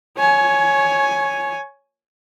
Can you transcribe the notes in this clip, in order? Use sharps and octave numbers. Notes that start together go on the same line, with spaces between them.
C#5 G#5